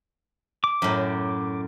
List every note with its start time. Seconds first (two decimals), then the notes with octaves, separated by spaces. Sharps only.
0.64 D6
0.82 F#2 A2